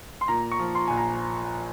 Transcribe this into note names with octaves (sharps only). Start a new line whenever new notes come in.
C6
A#2 A#5
C#6
F3
C6
A#1 G#5
A#5